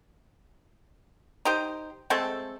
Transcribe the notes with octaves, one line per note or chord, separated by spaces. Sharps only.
D#4 G4 C5
G#3 A3 C4 A4